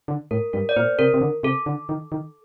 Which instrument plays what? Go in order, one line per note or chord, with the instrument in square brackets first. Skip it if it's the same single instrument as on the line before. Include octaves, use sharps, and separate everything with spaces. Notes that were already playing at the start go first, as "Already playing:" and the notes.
[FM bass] D3
[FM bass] A2 [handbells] A#4
[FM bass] G2 [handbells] A#4
[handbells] D5
[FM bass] A#2 [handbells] C5
[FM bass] C3 [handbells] A#4
[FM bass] C3
D3
[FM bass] C3 [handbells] A4
[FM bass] D3
D#3
D#3